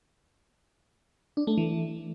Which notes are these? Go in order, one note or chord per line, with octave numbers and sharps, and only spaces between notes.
D4
A3
E3